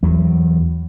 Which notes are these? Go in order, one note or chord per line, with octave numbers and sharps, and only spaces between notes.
E2 F#3